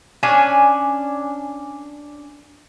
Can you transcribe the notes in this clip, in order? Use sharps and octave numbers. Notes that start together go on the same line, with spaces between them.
C#4 D4 G#5